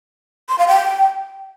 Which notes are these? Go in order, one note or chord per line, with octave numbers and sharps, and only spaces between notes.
C6
F5
G5